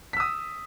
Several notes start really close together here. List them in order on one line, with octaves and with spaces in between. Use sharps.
B6 E6 D#6